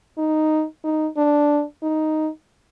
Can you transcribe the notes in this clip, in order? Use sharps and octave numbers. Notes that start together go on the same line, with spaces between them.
D#4
D#4
D4
D#4